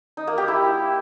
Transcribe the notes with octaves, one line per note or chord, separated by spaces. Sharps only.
D#4
A#3
G4
E4